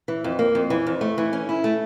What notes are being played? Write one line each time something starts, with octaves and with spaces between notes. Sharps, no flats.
E3
F2
A#3
F2
E3
F2
A3
E3
C#4
E4
A3